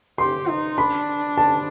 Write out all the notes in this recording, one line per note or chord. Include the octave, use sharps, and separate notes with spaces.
G4 C6
D#4
D4 B5
A5